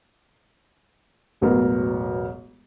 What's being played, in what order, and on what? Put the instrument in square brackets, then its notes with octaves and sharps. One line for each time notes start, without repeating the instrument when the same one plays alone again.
[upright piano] E1 A1 F#3 B3 A#4